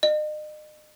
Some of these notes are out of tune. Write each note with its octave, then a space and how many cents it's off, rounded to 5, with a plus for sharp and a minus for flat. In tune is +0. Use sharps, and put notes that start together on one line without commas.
D#5 -40